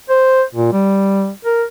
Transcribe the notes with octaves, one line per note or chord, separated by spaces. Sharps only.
C5
A#2
G3
A#4